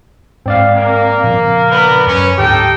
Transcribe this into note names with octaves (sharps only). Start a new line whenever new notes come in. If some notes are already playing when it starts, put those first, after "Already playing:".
G#2 C4 D5 F5
A#3
A#2 C#3 F3
B3 D4 A#4 B4 B5
F#2 F#3 C#4
D2 G#2 D#4 G4 A4 G5